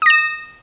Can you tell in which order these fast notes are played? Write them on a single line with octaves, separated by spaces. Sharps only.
D#6 A#6 E7